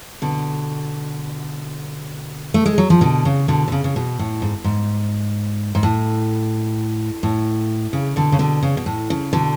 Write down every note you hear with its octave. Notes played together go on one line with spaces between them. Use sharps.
B2 D3
A3
G#3
F#3
F3
B2 D3
C#3
B2 D3
D3
C#3
C#3
B2
A2
G#2
G#2
G#2
A2
A2
C#3
B2 D3
C#3
B2 D3
C#3
B2
A2
C#3
B2 D3